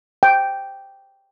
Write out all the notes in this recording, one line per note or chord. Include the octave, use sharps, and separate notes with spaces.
G5